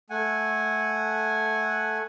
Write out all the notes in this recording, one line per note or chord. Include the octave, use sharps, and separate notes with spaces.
A3 F#5 G#5